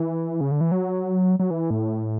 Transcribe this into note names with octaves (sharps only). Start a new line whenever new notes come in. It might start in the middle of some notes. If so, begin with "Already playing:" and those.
Already playing: E3
C#3
D3
E3
F#3
F#3
E3
A2